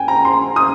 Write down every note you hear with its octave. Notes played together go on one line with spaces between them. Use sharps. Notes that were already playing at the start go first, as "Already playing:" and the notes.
Already playing: G5 G#5
A#5
C6
D#6